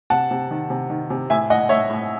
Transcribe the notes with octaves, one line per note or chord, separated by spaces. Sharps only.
C3 F#5 A5
C3
D#3
C3
D#3
C3
A2 E5 G#5
A2 D#5 F#5
A2 C#5 E5
A2